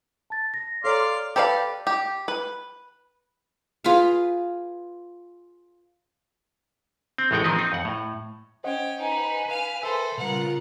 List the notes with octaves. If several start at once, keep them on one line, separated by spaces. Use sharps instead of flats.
A5 A6
A#6
A4 C#5 D5 F5 A#5 C6
G4 A4 B4 D5 F5
G4
B4
F4 G#4 B4 F5
C4
A1 A2 G#3 D#4 F#5 G5
D#3 F3 C4 B4 D#5
C4 D#4
F2 F#5
A2
C#4 C5 D#5 F#5 G5
D#4 B4 G#5 B5
F5 F6
A4 A#4 C5 E5 E6
A#2 C#3 G3 F4 A#4 F#5